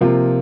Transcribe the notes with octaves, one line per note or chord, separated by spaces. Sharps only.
C3 F3 A#3 F4